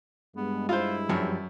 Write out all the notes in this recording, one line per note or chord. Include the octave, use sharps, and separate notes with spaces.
G2 G#3 B3
E4 F4 C5
F#2 F3 G3 C#5